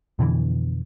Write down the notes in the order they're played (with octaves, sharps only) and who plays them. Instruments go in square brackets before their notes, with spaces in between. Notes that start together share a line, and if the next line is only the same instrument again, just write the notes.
[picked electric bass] F2 B2 D3 E3